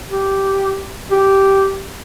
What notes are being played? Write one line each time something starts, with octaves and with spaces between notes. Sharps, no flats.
G4
G4